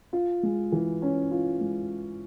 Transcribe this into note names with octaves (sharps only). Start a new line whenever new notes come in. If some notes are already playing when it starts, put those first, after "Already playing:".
F4
G#3
E3
C#4
F4
G#3